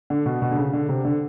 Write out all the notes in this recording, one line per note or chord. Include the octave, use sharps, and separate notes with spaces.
D3
B2
B2
D3
C#3
D3
C3
D3